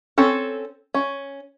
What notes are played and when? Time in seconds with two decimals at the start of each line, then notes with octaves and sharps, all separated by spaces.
0.18 C4 C#4 A4
0.94 C#4